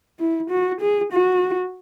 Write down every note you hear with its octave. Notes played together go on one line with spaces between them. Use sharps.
E4
F#4
G#4
F#4